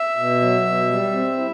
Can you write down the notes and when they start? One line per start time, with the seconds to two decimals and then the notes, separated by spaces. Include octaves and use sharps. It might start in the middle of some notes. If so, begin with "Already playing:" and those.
Already playing: E5
0.17 B2
0.41 F#3
0.65 B2
0.89 G3
1.13 C4
1.37 E4